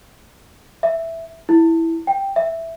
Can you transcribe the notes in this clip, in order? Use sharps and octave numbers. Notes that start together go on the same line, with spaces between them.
E5
E4
G5
E5